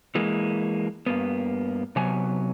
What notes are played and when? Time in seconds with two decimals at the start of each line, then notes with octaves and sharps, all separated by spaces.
0.15 E3 G#3 A#3
1.06 G2 A#3 B3
1.96 C3 F#3 B3 G#5